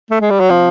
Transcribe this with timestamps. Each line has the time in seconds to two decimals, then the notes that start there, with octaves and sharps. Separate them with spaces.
0.11 A3
0.21 G#3
0.30 G3
0.40 F#3
0.50 C3 F3